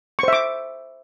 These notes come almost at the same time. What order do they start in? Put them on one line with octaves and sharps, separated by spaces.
C#6 C5 E5 D6